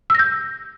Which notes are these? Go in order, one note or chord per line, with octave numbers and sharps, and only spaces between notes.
E6 G6 A#6